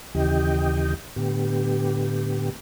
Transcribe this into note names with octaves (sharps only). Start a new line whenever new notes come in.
D#2 C#3 E3 G4 D#5 G5
A2 D3 B3 G4